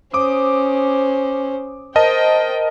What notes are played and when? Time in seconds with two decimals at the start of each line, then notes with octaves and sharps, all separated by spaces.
0.14 C#4 C5 D6 D#6
1.96 A#4 C5 D#5 G5 A5